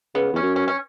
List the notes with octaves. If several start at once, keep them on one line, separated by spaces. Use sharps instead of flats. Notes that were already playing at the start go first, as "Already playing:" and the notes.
C#3 B3
E2 C#4
F#2
C#4
C#4